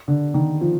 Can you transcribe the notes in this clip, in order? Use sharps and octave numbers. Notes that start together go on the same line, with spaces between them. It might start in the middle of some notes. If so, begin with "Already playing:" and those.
D3
D#3
F3